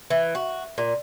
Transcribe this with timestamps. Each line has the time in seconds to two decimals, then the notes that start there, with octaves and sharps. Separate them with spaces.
0.10 E3
0.35 F#4
0.78 A#2